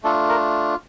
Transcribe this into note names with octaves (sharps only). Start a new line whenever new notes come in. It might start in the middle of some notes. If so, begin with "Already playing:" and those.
A3 D4 F4 A4
A#4